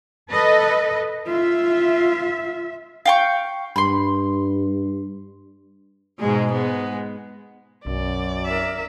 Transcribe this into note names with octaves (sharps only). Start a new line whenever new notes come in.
A4 B4 D#5
F4 E5
F5 G5 C#6
G2 B5 C6
G#2 B2 G#3
G#3 B3
B1 F#2 D5
A#4 E5